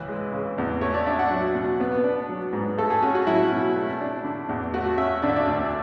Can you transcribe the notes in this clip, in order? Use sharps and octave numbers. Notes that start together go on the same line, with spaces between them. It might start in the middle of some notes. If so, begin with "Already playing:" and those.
Already playing: C#2 E3 B4
G#3
C#3
E2
A3 C#5
D5
D4 E5
F#5
F#3
B2
B3 B4
D4
F#3
G#2
A3 A4
G#4
C#4 F#4
F#4
F#3 E4
B2
A3
D4
D3
E2
A3 F#4
C#4 E5
D3 D5
E5
D5
D2